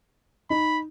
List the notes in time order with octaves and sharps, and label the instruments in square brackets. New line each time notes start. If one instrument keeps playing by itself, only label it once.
[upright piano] D#4 [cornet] B5